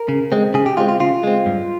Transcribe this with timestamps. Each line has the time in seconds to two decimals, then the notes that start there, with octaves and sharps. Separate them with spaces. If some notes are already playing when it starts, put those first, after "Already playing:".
Already playing: A#4
0.09 C#3
0.32 G#3 C4
0.54 C#3 G#4
0.66 G4
0.77 G#3 C4 F4
0.88 F4
1.00 C#3 F4
1.23 G#3 C4
1.46 G2